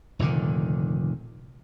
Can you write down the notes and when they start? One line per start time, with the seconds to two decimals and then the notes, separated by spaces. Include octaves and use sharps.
0.19 F1 A#2 D3 D#3